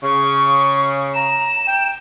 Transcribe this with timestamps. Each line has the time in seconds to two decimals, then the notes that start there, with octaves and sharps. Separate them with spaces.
0.03 C#3 C#6
1.14 A#5 E7
1.67 G5